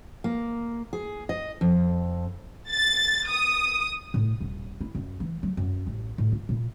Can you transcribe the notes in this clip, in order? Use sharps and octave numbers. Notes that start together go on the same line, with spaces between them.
A#3
G#4
D#5
F2
A6
D#6
A2
D#1
E4
F#2
E3
F#3
F#2
A1
A2
F4
A#2